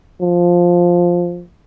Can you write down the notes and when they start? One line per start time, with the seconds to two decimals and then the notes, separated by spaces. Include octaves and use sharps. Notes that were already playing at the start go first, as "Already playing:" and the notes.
0.22 F3